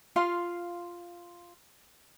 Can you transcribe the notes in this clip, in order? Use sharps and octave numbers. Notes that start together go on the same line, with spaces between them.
F4 F5 C6